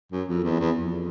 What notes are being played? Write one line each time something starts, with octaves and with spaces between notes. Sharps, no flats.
F#2
F2
E2
E2
F2